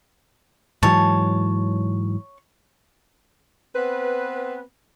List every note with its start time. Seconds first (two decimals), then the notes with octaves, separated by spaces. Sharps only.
0.83 G#2 E3 F#3 C#5 A5
3.75 B3 C4 B4